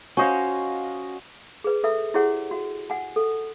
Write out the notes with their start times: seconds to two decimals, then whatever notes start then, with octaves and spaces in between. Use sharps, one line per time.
0.17 C#4 F#4 C5 C#5 D#5 F5
1.64 G#4 B4
1.84 A4 E5 E6
2.14 E4 G4 G#4 C#5 F#5
2.51 F#4
2.90 F#5 G#5
3.16 A4